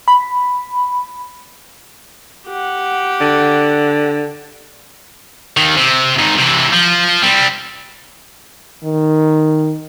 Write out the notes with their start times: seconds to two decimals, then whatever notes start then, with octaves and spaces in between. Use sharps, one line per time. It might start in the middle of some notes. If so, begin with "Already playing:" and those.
0.08 B5
2.47 G4 F#5
3.20 D3
5.57 D#2 D#3
5.77 C3
6.19 G#2 D#3
6.38 C3 E3
6.73 F3
7.23 G3 C4
8.84 D#3